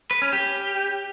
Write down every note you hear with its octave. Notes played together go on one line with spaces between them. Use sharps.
B4
C#4
G4